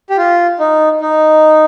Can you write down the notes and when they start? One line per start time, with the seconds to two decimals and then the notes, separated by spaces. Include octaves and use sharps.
0.10 G4
0.17 F4
0.59 D#4
1.01 D#4